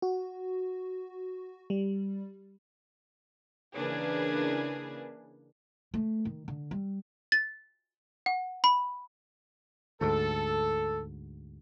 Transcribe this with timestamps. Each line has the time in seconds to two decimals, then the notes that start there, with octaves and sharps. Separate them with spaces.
0.02 F#4
1.70 G3
3.75 C#3 E3 A#3 D4 G#4 B4
5.94 A3
6.25 D#3
6.48 D3
6.71 G3
7.32 A6
8.26 F#5
8.64 B5
10.01 D2 G#2 A4